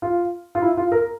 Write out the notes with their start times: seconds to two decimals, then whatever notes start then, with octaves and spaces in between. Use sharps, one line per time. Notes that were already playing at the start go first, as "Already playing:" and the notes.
0.02 F4
0.55 F4
0.62 E4
0.77 F4
0.92 A#4